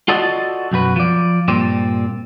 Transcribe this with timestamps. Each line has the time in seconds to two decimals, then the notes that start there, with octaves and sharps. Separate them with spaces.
0.08 F4 F#4 A4 D5 D#5
0.71 B1 F#2 F#4 B4
0.96 F3 D5
1.48 G2 A#2 C4 D5